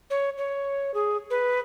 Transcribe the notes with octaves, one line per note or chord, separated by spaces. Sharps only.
C#5
C#5
G#4
B4